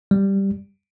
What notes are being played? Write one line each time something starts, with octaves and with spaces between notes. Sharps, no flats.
G3